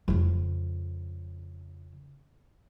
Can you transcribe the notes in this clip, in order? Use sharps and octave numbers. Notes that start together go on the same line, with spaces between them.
F2 C#3